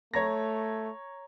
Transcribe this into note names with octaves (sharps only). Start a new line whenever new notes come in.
A3 C#5 A#5 A#6